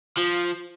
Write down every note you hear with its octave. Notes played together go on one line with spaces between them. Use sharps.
F3